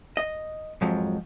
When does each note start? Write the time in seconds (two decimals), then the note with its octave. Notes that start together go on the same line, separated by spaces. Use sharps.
0.17 D#5
0.81 F2 G#2 F3 F#3